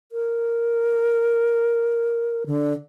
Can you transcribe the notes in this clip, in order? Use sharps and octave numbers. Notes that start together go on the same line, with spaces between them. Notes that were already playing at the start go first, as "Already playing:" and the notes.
A#4
D3